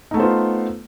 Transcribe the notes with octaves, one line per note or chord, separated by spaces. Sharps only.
A3 B3 D#4 F4 C5